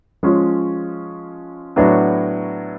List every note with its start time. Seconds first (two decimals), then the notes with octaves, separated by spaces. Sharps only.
0.23 F3 G#3 C#4 F4
1.76 A2 F#3 B3 D4 F#4